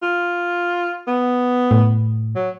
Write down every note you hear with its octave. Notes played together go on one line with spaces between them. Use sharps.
F4
B3
A2
F#3